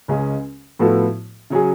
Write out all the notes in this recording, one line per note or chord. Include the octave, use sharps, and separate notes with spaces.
C#2 C#3 G#3 C#4 G#4
A2 F3 B3 F#4 A4
C#3 F#3 C#4 G#4